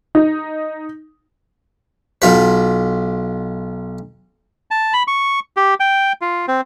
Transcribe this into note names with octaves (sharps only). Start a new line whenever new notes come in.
D#4
B1 F4 B4
A5
B5
C#6
G4
G5
F4
C4